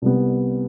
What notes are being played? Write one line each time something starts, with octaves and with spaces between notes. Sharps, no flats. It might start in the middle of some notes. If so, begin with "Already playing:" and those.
C2 C3 G3 B3